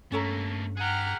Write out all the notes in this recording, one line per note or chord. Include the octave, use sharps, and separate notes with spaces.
G2 A3 A#3 C#4 A4 A#5
G#4 F#5 G5 A#5 F6